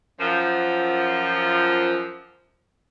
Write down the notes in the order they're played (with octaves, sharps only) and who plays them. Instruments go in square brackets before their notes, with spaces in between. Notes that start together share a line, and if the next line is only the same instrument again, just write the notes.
[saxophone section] F#2 F3